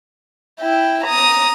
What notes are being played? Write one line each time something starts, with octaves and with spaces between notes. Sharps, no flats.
E4 G5
A#5 D#6